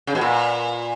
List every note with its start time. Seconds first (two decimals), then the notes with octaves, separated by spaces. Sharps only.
0.07 C#3
0.15 B2
0.21 A#2